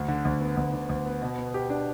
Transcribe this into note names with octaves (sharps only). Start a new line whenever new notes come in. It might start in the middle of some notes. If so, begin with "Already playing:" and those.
Already playing: D2
D3
D2
B3
D2
D3
D2
B3
B2
B3
G4
D4